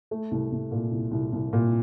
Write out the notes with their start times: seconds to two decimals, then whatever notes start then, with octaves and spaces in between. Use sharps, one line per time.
0.11 A3
0.31 C2
0.52 C2
0.72 A#2
0.92 C2
1.12 C2
1.33 C2
1.53 A#2